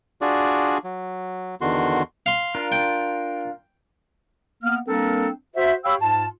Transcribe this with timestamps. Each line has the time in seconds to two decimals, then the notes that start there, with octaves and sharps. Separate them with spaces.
0.21 D4 F4 F#4 G#4 D5
0.84 F#3
1.61 E2 D3 D#3 F#4 C6
2.26 F5 C6
2.55 D4 F4 A#4
2.72 G5
4.63 A#3 B3 F6
4.87 G3 A#3 C4 D4 A4 A#4
5.55 F#4 C5 E5
5.85 G4 C#5 F5 G5 B5 E6
6.01 G#2 F4 A5